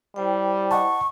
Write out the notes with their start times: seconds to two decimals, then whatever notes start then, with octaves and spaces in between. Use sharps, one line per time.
0.16 G3 E4 C5 G5
0.71 D#5 F#5 A5 C#6